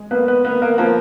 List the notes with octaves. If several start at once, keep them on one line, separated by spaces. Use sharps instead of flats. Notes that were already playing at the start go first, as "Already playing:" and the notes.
Already playing: G#3
A#3 B3 B4
B3 B4
A#3 B3 B4
A#3 A#4
F3 A#3 A#4